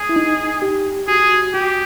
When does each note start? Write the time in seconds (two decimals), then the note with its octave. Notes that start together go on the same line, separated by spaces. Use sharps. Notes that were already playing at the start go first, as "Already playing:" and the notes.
Already playing: G#4
0.09 E4
0.16 D#4
0.62 G4
1.08 F#4 G#4
1.54 F#4 G4